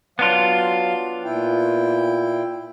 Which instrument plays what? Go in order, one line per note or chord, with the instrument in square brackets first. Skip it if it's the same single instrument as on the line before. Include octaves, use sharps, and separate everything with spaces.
[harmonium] F#3 F5 [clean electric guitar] B3 D4 F4
[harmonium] A#2 E4 G5